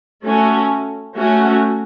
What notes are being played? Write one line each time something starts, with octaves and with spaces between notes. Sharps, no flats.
A3 C#4 F#4
A3 C#4 F#4